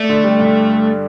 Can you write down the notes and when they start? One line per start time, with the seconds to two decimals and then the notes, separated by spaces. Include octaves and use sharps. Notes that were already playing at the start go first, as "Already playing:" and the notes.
Already playing: A3 D5
0.09 D3
0.24 G3
0.40 G2